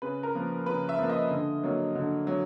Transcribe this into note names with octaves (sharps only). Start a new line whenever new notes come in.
C#3 B4
A#4
F3 A#3
C#3 B4
E5
F3 A#3
D#5
D3
F#3 A#3
D3
F#3